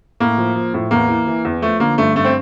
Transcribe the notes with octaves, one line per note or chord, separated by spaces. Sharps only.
A2 A#3
F3
F3
A2
E2 A#3
E3
E3
E2
F3 A3
D3 A#3
G2 A3
G2 A3
C4